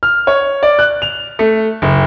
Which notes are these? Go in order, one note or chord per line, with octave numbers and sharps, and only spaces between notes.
F6
C#5
D5
F#6
F7
A3
F#1